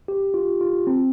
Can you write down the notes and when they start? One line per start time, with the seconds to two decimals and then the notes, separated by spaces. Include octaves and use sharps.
0.08 G4
0.34 F4
0.61 F4
0.87 C4